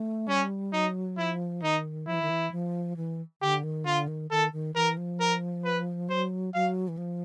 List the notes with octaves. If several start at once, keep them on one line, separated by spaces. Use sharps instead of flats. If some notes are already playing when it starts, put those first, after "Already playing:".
Already playing: A3
G3 C#4
F#3 D#4
F3 E4
D#3 D#4
F3 E4
E3
D#3
E3
F3
E3
D3 G4
D#3
D3 F4
D#3
D#3 A4
D#3
E3 A#4
F3
A#4
B4
F#3 C5
F#3 F5
E3
F3